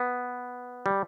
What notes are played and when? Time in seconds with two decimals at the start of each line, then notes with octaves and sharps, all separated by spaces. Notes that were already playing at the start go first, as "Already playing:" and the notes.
Already playing: B3
0.86 G3